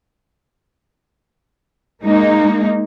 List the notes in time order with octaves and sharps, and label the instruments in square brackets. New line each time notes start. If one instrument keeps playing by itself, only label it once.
[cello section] G#3 A#3 D#4